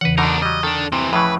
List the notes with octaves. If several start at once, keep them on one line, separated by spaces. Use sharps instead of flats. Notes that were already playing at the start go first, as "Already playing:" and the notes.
E2 C#3 E3 B4 F#5
B2 D3 D4 D#4 A#4
F#3 G3 D#5
D#3 D4 A4
C3 E3 C4
A2 C#3 E3 F3 B4